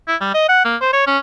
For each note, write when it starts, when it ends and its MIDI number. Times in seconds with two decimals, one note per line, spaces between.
0.08 0.16 64
0.21 0.34 55
0.34 0.48 75
0.49 0.64 78
0.65 0.76 58
0.81 0.89 72
0.93 1.02 73
1.07 1.18 61